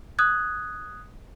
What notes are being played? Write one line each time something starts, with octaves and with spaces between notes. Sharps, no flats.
D#6 F#6 G#6